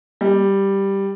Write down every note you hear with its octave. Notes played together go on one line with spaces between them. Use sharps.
G3